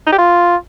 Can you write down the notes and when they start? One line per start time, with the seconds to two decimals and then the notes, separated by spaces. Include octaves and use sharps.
0.06 D#4
0.12 G4
0.18 F4